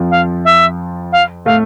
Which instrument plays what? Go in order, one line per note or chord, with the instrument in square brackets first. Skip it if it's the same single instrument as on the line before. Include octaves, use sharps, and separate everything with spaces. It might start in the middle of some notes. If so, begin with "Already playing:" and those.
Already playing: [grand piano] F2 F3
[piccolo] F5
E5
F5
[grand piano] A2 A3 [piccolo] F5